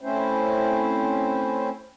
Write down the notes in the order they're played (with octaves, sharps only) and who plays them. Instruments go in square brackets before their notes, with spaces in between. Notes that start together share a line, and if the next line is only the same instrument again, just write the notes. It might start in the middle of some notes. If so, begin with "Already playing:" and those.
[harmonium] A3 C4 C#4 E4 C5